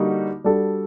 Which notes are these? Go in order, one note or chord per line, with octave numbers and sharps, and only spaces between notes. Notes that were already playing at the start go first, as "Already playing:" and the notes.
Already playing: D3 G3 A#3 D#4 F#4
G3 D4 F#4 A4